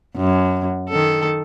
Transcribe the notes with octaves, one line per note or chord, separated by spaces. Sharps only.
F#2
D#3 A4